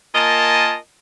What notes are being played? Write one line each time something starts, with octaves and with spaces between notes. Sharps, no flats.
A#3 F4 A#4 D#5 G#5 A5